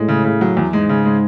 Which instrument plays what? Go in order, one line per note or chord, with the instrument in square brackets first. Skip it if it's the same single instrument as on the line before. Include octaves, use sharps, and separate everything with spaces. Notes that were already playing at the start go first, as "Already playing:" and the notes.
Already playing: [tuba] A2 [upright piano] G#3
[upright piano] C#3
C#3
F#3
E2
[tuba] G#2 [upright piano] G#3
[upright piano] C#3
G#3